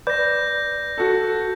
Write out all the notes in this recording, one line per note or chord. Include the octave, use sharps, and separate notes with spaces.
B4 D5 G6 A#6
F#4 A4